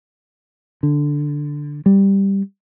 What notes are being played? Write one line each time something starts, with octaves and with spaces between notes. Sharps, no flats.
D3
G3